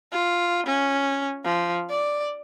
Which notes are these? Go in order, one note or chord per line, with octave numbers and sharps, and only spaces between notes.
F4
C#4
F3
D5